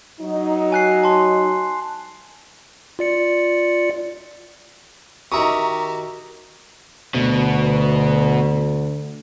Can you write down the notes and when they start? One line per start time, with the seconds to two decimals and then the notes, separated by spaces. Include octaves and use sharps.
0.21 F#3 D#4
0.72 G#5 F#6 C7
1.03 A5 C6
2.99 F4 D5 C#7
5.32 D#3 F#4 G4 E5 A#5 C#6 D#6
7.14 D2 B2